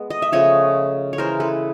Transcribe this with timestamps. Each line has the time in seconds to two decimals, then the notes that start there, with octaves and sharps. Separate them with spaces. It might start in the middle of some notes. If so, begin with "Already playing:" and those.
Already playing: G#3 B3
0.10 D#5
0.22 E5
0.32 C#3 F3 A3 C#5 D#5
1.13 C#5
1.18 C#3 E3 G#3 A#4 C5
1.40 A4 B4